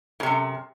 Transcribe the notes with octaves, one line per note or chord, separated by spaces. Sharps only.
F#2 A2 C3